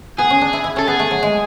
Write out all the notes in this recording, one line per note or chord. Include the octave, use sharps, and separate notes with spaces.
B3 G#4
C#4
D4
E4
E4
C#4 A4
B3 G#4
A3
F#3
G#3